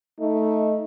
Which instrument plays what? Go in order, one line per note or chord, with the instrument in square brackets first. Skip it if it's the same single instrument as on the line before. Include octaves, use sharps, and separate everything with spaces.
[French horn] A3 [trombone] D#4